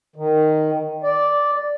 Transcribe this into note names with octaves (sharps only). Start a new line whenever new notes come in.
D#3
D5